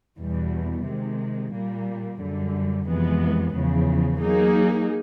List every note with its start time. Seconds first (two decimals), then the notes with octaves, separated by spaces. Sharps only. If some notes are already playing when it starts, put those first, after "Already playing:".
0.19 E2 B2 G3
0.86 C3 D#3 G#3
1.53 A#2 G3 A#3
2.20 F#2 D3 G3
2.87 F2 C3 E3 G#3 B3
3.54 E2 C#3 F3
4.21 F#3 A#3 D#4 G#4